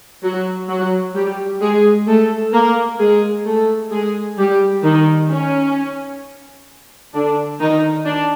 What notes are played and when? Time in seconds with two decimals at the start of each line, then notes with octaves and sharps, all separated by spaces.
0.23 F#3 F#4
0.68 F#3 F#4
1.15 G3 G4
1.61 G#3 G#4
2.07 A3 A4
2.53 A#3 A#4
2.99 G#3 G#4
3.45 A3 A4
3.92 G#3 G#4
4.38 G3 G4
4.83 D#3 D#4
5.30 C#4
7.14 D3 D4
7.60 D#3 D#4
8.05 D4